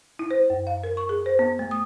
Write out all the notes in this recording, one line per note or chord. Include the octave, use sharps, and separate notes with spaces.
E4
C5
F#2
F5
A#4
C#6
G#4
C5
B3
A3
D#6